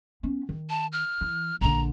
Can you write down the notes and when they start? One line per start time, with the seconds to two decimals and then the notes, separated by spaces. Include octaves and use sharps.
0.23 B3 C#4
0.49 D#3
0.70 A5
0.92 F6
1.21 E3
1.61 A#1 D3 A#5